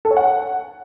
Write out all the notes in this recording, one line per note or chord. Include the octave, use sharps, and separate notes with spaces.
A4
C#5
F#5